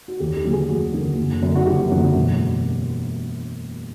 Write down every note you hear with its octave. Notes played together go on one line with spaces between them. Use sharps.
F#4
D#2 G4
G4
D3 F#3 A#3
G#4
D#2 F#4
D3 F#3 A#3
F#1
F#2 D3
F#4
F#1 G4
F#2 D3
E1